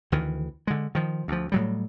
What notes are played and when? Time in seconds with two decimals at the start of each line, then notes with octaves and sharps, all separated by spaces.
0.12 D2 D#3 E3
0.67 D3 G#3
0.95 D#3 F3
1.28 D2 F3
1.52 A2 F#3 G3